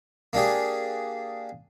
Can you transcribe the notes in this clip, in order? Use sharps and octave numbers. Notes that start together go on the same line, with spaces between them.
A#3 D4 G4 G#4